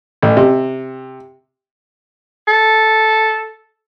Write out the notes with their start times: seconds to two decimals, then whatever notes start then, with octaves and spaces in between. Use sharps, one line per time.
0.22 A1
0.37 C3
2.48 A4